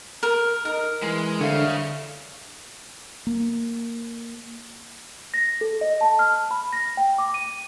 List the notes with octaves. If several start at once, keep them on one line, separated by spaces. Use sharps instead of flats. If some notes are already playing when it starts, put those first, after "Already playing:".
A#4
D#4 A#4
E3 G#3
F2 D3 G3 C#5 E5 F5
A#3
A#6
A4
D#5
A5
F6
B5
A#6
G5
D6
D#7